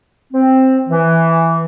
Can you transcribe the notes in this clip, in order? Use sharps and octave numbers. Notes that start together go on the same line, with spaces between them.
C4
E3